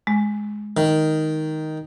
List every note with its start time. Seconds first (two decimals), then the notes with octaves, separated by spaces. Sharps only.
0.07 G#3
0.77 D#3